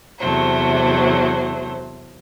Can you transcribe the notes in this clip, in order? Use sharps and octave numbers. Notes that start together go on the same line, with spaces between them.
E2 C3 F#3 A3 C5